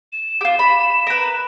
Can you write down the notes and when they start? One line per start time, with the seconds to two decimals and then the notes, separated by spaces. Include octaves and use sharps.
0.13 E7
0.41 F4 G4
0.59 B5
1.07 A#4 B4